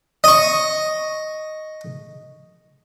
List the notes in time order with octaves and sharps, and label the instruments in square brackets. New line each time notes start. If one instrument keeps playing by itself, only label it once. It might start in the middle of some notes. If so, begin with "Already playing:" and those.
[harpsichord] D#5 C#6